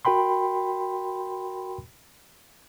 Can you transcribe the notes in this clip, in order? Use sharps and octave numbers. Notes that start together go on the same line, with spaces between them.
F#4 A#4 G5 B5 C6